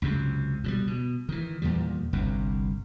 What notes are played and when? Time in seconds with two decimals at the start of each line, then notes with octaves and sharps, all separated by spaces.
0.02 C#2 F#2 C3
0.64 B2 F#3 G3
0.87 B2
1.29 D#3 E3
1.62 E2 A#2 D#3 G3
2.13 G1 C2 G2